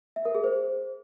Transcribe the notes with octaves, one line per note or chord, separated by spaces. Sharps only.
E5
A#4
G#4
C5